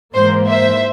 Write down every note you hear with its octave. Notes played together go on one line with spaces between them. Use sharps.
G#2 E3 A#3 C5
C5 E5